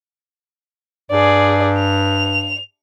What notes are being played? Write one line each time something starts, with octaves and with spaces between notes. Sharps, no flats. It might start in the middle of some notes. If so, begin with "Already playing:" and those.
G2 G#4 D5
F7